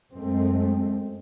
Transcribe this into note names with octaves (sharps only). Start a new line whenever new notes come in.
F#2 G#3 A3 C4